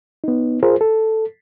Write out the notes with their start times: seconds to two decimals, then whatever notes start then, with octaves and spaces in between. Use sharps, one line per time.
0.24 B3 D#4
0.63 F4 G#4 A#4 C5
0.81 A4